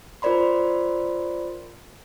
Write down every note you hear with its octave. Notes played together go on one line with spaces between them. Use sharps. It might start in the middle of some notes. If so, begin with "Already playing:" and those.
F4 A#4 C5 D5 B5 C6